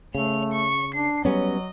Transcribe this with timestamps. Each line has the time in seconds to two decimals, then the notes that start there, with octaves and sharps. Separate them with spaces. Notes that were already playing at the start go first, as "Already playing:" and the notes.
0.15 C#3 A3 F7
0.52 C#6
0.94 D4 C7
1.25 F#3 G3 B3 C#4 D#5